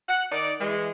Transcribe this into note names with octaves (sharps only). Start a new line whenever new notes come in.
F#5
D#3 D#4 D5
E3 G#3